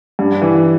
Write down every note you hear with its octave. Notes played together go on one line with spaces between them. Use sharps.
G2
E3